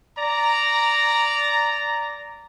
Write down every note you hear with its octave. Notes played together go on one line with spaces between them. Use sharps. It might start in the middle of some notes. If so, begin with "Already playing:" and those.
D5 A#5